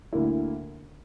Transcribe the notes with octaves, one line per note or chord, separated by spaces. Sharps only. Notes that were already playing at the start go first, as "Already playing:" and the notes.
D2 D3 A#3 E4